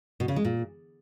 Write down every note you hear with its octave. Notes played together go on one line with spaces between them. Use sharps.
B2
C#3
G#3
A#2